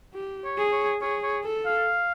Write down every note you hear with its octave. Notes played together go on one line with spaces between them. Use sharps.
G4
C#5
G#4
C#5
G#4 C#5
C#5
A4
F5